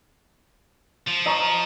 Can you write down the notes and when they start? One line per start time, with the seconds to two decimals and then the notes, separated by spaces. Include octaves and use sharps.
1.07 F3
1.26 D#5 A#5 C#6